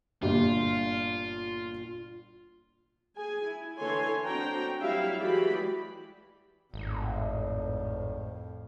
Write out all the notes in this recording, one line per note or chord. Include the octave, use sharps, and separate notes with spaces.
G1 A#2 F4 G4
G#4 G#5
E4
D3 E3 A4 C#5 G#5 C6
C4 D4 F#4 G5 A#5
F#3 G3 E4 E5 F5
E3 G#3 F#4 G4 D5 B5
G#1 F2 A2